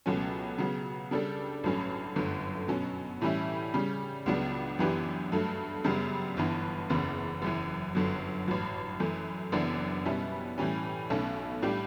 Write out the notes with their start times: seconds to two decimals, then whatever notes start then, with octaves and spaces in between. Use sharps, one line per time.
0.06 C#2 B2 F#3 A3 C#4
0.58 C#3 F#3 B3
1.11 C#3 G3 D4 A4
1.63 A1 G2 F#3 A3 C#4
2.16 G1 F#2 D3 A3
2.68 B2 F#3 C#4
3.21 A2 E3 G3 C#4 E4
3.74 C#3 G3 C#4
4.26 C#2 C#3 F#3 B3 D4
4.79 F#2 E3 B3 D4 G4
5.32 G2 F#3 A3
5.84 F#2 C#3 G3 B3
6.37 G1 G2 E3 B3
6.90 F#1 E2 C#3
7.42 F#1 F#2 E3
7.95 G1 F#2 D3 F#3
8.48 A1 G2 F#3
9.00 F#2 E3 A3
9.52 F#1 F#2 E3 B3 D4
10.05 B2 G3 C#4 E4
10.58 A2 E3 G3 C#4
11.10 B1 B2 A3 C#4
11.62 A2 G3 D4 G4